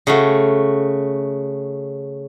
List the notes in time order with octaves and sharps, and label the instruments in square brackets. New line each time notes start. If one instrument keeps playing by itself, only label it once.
[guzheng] C#3 A3 F#4